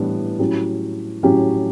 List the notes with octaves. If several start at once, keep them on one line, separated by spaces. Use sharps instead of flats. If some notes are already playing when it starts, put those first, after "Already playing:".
Already playing: A2 E3 G3 B3 D4
A2 F#3 C#4 G4
A2 F#3 C#4 G4